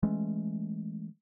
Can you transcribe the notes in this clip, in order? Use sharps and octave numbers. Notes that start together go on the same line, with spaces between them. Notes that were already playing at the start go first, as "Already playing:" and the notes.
E3 G#3 A3 C#4